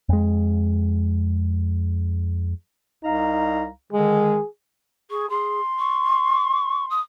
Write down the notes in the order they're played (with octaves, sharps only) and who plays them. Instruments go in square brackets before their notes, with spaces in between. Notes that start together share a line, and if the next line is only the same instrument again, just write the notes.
[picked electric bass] F2 G#3
[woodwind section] C2 F5 A#5 [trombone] D#4
[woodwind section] D3 D#3 G#3 [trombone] G#4
[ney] G#4 [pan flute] C#6
[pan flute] G#4 [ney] C6
[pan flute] C#6
D#6